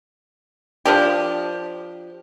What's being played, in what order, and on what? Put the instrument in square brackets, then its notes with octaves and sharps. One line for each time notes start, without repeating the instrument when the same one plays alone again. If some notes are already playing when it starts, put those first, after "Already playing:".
[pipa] F3 D4 G4